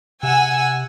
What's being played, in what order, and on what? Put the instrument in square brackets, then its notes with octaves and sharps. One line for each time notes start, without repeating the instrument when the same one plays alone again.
[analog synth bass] C3 [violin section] F#5 G#5 E6